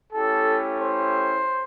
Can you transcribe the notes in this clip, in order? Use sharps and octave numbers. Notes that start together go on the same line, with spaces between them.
A3 C#4 E4 G4 A4
C5